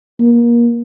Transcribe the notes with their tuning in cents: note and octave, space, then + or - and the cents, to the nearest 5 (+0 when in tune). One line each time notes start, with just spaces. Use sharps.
A#3 +25